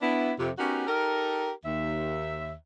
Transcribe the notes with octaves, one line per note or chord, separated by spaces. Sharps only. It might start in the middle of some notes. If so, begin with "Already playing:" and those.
B3 D4 E4
F2 C3
B3 C#4 D#4 F#4 G4 A#4
D#4 G4 A4 A#4
D#2 E5